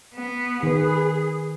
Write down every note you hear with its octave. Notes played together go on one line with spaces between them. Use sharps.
B3
D#3 G#4 B4